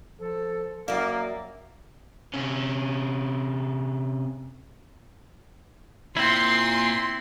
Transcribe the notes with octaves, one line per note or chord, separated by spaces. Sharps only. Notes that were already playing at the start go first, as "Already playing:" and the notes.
F3 A4
F#2 A#3 A#4 D5 E5
C3 C#4
A#2 C4 E4 C6